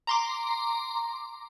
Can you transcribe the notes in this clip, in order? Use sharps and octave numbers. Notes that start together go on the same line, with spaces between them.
A#5 C6 D6